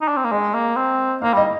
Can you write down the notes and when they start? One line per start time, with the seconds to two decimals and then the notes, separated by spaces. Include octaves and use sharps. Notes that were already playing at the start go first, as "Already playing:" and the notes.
0.01 D#4
0.08 D4
0.17 C4
0.24 A#3
0.32 G#3 D#5
0.54 A#3
0.76 C4
1.22 A#3 F5
1.34 G3 D#5